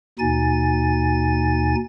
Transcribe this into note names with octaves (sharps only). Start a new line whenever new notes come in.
D#2 B2 D#4 G#5 A6